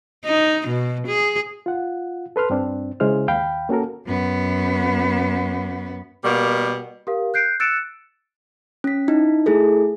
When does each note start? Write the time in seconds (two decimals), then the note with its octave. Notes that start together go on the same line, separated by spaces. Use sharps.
0.25 D#4
0.68 B2
1.07 G#4
1.66 F4 F#5
2.36 A4 B4 C6 F6
2.50 G2 C4 D4
3.00 C#3 G#3 E4 C5 F6
3.28 D#2 F5 G5 B5
3.69 A#3 C#4 F#4 A4 A#4
4.06 F#2 B3
6.24 B2 G3 A#3
7.07 G4 A#4 F5
7.34 F#6 G6 C7 D7
7.60 E6 F#6 A6 C#7 D7 E7
8.84 C#4 B6
9.08 D#4 E4
9.46 A3 E4 G#4 A4